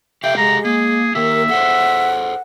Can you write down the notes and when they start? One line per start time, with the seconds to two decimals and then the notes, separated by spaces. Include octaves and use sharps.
0.24 G4 A4 E5 F5 G5
0.37 G#3 A#5
0.65 A#3 G#4
1.15 D#3 A#3 G4 A#4 E5
1.49 G#4 A4 C5 F#5